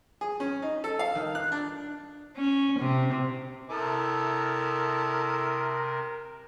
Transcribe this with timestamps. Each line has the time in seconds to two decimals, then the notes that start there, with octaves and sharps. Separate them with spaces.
0.21 G#4
0.40 C#4
0.62 D#4
0.84 A4
0.99 F5
1.15 D#3
1.35 F#6
1.52 D4
2.36 C#4
2.79 C3
3.70 C3 E4 A4 A#4 A5 D#6